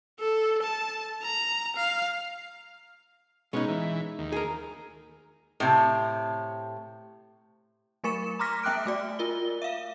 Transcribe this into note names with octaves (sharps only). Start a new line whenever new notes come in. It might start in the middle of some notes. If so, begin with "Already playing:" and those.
A4
A5
A#5
F5
B2 G#3 C#4 D#4
E3
D#2
G#4 A#4
A2 C3
F#3 A3 A#4 C#6 C#7 E7
A#5 C6 D6 F6 A#6 B6
A#3 E5 G5 D6 F#6 D7
A3 F#4 D5
F4 A#4 G7
E5 F5